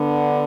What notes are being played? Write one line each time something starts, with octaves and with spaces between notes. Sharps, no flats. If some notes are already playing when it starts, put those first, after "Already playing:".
Already playing: D3 B3 D4